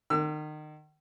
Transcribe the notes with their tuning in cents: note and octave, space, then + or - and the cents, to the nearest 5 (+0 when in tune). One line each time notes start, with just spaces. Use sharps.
D#3 -30 E6 +40